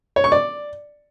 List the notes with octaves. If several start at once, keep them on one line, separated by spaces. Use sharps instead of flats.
C#5
C#6
D5